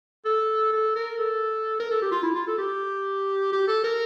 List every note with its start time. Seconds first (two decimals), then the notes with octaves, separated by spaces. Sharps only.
0.25 A4
0.72 A4
0.96 A#4
1.19 A4
1.80 A#4
1.91 A4
2.02 G4
2.11 F4
2.23 E4
2.35 F4
2.47 A4
2.58 G4
3.52 G4
3.68 A4
3.84 A#4